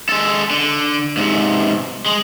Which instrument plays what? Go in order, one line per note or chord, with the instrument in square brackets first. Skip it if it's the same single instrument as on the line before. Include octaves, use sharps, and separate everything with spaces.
[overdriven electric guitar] G#3 A4
D3
G#2 C3
G#3